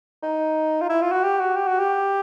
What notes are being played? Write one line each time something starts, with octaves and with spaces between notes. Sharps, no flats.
D#4
F4
E4
F4
F#4
G4
F#4
G4
F#4
G4